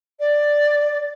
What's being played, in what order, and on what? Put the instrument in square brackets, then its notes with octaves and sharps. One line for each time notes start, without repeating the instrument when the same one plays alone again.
[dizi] D5